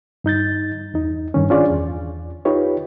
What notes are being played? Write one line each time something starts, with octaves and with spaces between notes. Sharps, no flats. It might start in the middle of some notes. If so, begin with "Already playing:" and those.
G2 D#4 G6 A6
E2 D#4
G2 D#3 C#4
C#4 D4 F4 G#4 D5
E2
D#4 F4 G4 B4 C#5